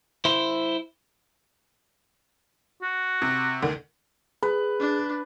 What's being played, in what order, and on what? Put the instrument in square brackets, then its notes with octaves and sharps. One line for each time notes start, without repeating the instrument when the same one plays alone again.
[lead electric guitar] E4 C5
[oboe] F#4
[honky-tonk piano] C3
D2 D3 D#3
[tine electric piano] G#4 [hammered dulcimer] B4
[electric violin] D4